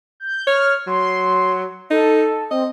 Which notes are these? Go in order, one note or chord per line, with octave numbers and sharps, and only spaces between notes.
G6
C#5 F6
F#3 C6
D#4 A4
C4 D#5